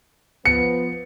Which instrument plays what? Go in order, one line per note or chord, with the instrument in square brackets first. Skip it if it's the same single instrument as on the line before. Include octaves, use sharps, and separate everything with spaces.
[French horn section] F3 B3 [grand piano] C#7